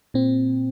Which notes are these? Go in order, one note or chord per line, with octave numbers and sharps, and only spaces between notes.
A#2 C4